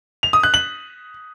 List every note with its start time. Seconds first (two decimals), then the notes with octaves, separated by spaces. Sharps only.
0.23 F7
0.33 D#6
0.43 F#6
0.54 F#7